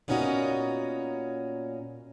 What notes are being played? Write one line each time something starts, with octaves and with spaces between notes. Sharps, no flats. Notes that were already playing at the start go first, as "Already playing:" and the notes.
A#2 B3 C#4 D#4 F4 F#4